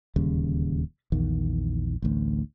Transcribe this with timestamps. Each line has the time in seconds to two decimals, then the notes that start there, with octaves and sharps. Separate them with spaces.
0.16 D1 D#2 C#3 G3
1.12 A#1 E2 D#3
2.02 A1 D2